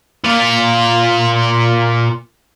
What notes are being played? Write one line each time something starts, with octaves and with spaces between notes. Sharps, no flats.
A#2 F4